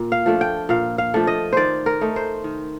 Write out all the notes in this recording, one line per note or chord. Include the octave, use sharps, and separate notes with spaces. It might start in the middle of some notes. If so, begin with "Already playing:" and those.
Already playing: A#2
F5
F3 A3 D4
G5
A#2 F5
F5
F3 A3 D4
D#5
D#3 C5 D5
A#4
A3 D#4
C5
D#3